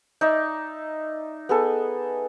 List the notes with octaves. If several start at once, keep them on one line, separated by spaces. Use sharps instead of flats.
D#4 D5 E5
B3 G#4 A4